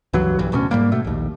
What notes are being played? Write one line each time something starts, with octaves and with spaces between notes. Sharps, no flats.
C#2 G2 E3 F#3
B1 G2 E3
D1 D2 B2 C#4
G#2 G3 A#3
B2 A3
A#1 D#2